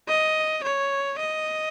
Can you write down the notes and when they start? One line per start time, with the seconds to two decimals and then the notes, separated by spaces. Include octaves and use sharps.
0.08 D#5
0.64 C#5
1.19 D#5